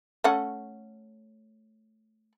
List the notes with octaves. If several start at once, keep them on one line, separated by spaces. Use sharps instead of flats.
A3 C#4 F#5